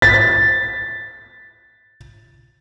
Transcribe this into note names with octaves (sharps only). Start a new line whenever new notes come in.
A6 B6